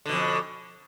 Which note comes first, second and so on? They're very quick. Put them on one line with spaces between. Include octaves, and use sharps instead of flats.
D3 B2 F2